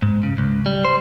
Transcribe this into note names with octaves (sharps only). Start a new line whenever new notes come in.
G#2
C#3
C#2
G3
C5